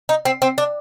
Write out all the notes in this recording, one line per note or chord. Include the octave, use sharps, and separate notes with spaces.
D#4
C4
C4
D4